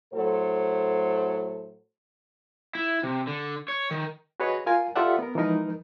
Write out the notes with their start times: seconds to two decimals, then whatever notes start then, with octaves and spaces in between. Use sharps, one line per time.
0.13 A2 F#3 A4 C5
2.75 E4
3.03 C3
3.27 D3
3.68 C#5
3.91 D#3
4.40 F#4 G#4 B4 C#5 D#5
4.66 F4 A#4 F5 G#5
4.96 F4 G4 A4 D5 E5 F#5
5.19 B3 A#4
5.35 E3 F3 G#3 D#4 A#4 B4